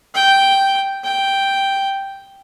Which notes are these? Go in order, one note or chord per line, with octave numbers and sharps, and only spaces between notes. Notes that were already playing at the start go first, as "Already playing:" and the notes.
G5
G5